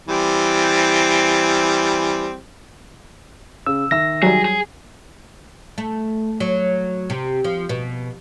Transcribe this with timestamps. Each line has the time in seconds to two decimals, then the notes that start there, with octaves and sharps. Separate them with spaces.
0.08 E3 G3 C4
3.67 C#3 E6
3.91 D#3 E5 E6 A#6
4.23 F#3 G3 G#4
4.45 G#4
5.78 A3
6.40 F#3
7.10 C3
7.44 F3
7.69 B2